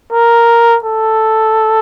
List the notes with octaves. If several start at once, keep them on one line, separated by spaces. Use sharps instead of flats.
A#4
A4